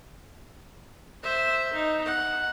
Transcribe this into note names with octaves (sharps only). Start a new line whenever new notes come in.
C5 E5
D#4
F#5